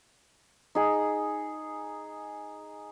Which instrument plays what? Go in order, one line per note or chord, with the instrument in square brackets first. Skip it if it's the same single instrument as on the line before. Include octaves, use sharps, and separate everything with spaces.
[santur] D#4 G#4